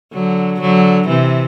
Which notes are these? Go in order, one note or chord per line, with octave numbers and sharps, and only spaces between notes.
D3 F#3
D3 F#3
C3 E3